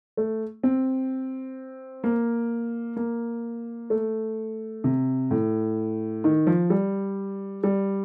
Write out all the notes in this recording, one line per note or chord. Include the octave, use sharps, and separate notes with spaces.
A3
C4
A#3
A#3
A3
C3
A2
D#3
F3
G3
G3